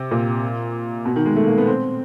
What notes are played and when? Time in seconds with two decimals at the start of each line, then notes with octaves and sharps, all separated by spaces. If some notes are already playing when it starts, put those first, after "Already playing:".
Already playing: C3
0.11 A#2
1.05 B2
1.16 D#3
1.26 G#3
1.36 A3
1.48 A#3
1.58 B3
1.67 C4